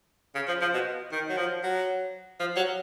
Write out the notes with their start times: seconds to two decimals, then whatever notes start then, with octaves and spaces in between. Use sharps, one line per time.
0.35 C#3
0.47 F3
0.61 F3
0.73 B2
1.12 D#3
1.29 F#3
1.37 F3
1.63 F#3
2.40 F3
2.56 F#3